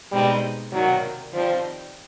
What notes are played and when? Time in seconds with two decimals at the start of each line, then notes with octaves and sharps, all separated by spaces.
0.12 B2 G3 G#3 C4 D#4
0.72 C3 D#3 F#3 G3 A#3
1.33 D#3 F3 G3 C4